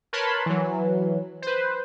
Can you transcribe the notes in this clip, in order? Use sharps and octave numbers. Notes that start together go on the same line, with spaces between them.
A#4 B4 C#5 A5 B5 C6
E3 F#3
B4 C5